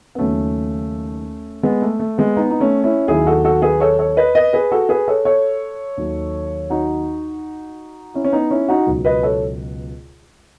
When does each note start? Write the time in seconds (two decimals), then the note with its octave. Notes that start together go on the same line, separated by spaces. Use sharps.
0.15 B3
0.19 D#2 C#3 F#3 A3 C#4
1.63 G#3 B3
1.82 A3
1.99 A3
2.18 G#3 B3
2.37 B3 D#4
2.50 D#4
2.60 A3 C#4
2.84 C#4 E4
3.08 D#2 D#3 F#3 E4 G#4
3.27 F#4 A4
3.44 F#4 A4
3.62 G#4 B4
3.80 A4 C#5
3.99 A4 C#5
4.17 B4 D#5
4.35 B4 D#5
4.53 G#4 B4
4.71 F#4 A4
4.89 G#4 B4
5.08 A4 C#5
5.25 A4 C#5
5.97 D#2 D#3 F#3
6.70 D#4 F#4
8.14 C#4 E4
8.24 C#4
8.32 B3 D#4
8.51 C#4 E4
8.68 D#4 F#4
8.87 C#2 B2 F#3
9.05 B4 D#5
9.23 A4 C#5